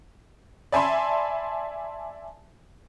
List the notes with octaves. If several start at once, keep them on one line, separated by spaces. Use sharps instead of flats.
D5 E5 G#5 A5 B5 C6